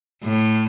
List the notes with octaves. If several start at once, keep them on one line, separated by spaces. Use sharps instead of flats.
A2